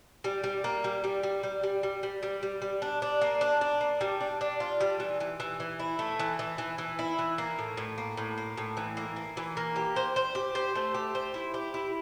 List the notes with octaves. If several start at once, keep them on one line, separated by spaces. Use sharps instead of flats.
G3
G3
A#3
G3
G3
G3
G3
G3
G3
G3
G3
G3
G3
D4
D4
A#3
D4
D4
A#3
G3
D4
D4
F4
G3
E3
E3
E3
E3
E4
A3
E3
E3
E3
E3
E4
E3
A#3
A2
A2
A#3
A2
A#3
A2
E3
A#3
A#3
E3
A#3
G4
C5
C5
G4
C5
A3
G4
C5
E4
G4
E4